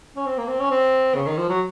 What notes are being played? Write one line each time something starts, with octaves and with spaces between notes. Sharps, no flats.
C#4
C4
A#3
C4
C#4
C4
C#3
D#3
F3
F#3